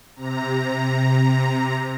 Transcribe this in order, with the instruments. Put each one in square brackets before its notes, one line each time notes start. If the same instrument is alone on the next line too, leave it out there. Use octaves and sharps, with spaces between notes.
[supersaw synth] C3 A#5